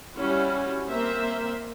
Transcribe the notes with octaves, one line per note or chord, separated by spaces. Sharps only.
G3 C#4 E4 F#4
A#3 C4 C5 E5